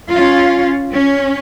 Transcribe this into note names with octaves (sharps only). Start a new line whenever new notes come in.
C#4 F4
C#4